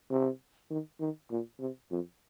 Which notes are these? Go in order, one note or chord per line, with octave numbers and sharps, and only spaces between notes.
C3
D#3
D#3
A#2
C3
F2